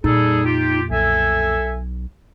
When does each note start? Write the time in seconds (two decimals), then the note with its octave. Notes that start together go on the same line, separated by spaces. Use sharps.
0.04 F2 A#2 G3 D#4 G#4 A4
0.45 F4 G4
0.90 B1 A4 E5 G#5